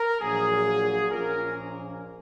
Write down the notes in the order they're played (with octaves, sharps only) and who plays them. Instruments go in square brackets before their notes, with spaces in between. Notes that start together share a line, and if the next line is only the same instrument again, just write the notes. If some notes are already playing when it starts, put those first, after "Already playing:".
Already playing: [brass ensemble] A#4
A#1 A#2 F#3 A#3 G#4
A#1 A#2 F3 A#3 C#4 A#4